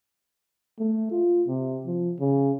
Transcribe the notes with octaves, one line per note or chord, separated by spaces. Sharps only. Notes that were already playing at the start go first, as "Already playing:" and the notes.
A3
F4
C3
F3
C#3